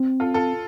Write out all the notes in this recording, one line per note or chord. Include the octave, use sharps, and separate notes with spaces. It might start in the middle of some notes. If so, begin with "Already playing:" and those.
Already playing: C4
F4 A4
F4 A4